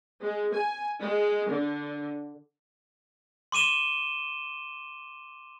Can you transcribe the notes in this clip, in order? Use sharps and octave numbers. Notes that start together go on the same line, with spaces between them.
G#3
G#5
G#3
D3
C6 D6 D#7 E7 G7